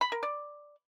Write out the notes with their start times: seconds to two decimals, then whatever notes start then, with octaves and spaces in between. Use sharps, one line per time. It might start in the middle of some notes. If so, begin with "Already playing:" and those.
0.01 B5
0.12 A#4
0.23 D5